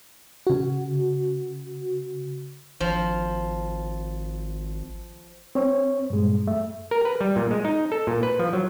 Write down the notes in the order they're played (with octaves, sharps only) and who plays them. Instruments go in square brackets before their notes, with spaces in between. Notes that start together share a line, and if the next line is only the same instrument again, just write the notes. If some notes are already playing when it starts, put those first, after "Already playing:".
[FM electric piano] C#3 F#4
[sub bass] G#1 [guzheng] F3
[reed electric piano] C4 C#5
G2 A#2 G#3
F#2 A3 E5
[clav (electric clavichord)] A#4
B4
G3
A#2
G#3
D#4
A4
A#2
B4
F3
F#3